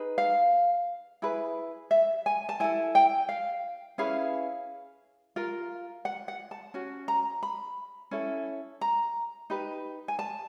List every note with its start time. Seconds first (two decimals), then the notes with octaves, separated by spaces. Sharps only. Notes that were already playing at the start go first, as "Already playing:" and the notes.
Already playing: D#4 G#4 B4
0.18 F5
1.22 E4 G#4 B4
1.91 E5
2.26 G#5
2.49 A5
2.60 E4 A4 G#5
2.95 G5
3.29 F5
3.98 C#4 E4 G#4 B4 F5
5.36 F4 A#4
6.05 F#5
6.28 F#5
6.51 A5
6.74 C#4 F#4
7.08 A#5
7.43 B5
8.11 C#4 E4 A4
8.81 A#5
9.50 D#4 G4 B4
10.08 G#5
10.19 A5